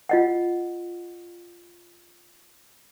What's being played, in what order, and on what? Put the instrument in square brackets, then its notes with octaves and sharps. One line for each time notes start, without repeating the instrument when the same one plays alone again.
[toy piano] F4 D#5 F#5